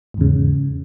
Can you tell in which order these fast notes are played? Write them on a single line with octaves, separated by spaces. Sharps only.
G#2 E2 C#3